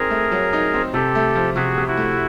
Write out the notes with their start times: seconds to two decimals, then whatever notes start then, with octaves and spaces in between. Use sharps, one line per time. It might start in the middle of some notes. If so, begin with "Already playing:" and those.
Already playing: C4 D#4 G#4 A#4
0.10 A3
0.31 F#3
0.53 D#4
0.74 C4
0.94 C3 G4 A4
1.15 A3
1.35 F3
1.56 C3 F#4 G#4
1.78 C3
1.87 E4 F#4
1.97 A3